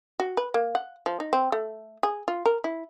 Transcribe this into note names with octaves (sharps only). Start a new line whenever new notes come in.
F#4
B4
A#3
F#5
F3
D#4
C4
A3
G#4
F4
A#4
E4